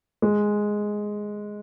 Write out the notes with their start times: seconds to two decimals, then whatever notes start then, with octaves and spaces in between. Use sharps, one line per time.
0.22 G#3